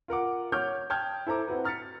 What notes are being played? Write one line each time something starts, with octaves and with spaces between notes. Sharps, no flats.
F4 A#4 F#5 D6
C#5 F#5 C#6 D6 F6 G6
G5 A5 D#6 F6 G6 G#6
E4 A4 C5 A#5 D6
C4 E4 F#4 B4
A#5 F6 A6 B6 C#7